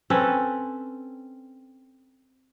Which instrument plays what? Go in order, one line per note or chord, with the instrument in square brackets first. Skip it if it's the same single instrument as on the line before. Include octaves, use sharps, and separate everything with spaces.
[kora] C4 C#4 A4 B4